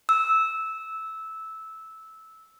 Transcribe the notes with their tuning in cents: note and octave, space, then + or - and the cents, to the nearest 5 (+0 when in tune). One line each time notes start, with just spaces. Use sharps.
E6 -10